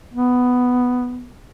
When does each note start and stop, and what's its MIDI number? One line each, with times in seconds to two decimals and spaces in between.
0.14 1.28 59